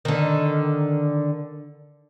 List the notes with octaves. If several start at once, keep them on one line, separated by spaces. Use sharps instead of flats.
D3 D#3